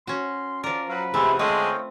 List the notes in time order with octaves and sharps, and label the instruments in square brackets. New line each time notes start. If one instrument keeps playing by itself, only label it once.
[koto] C#4 F#4 [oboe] C6
[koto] F3 A#4 [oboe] D5
[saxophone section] F#3 [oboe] B4 [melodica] F5
[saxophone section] E2 C3 [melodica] G#3 E4 [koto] A3
[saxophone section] D3 G#3 [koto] C4 B4 [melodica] C#5 F5 G5 [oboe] D#5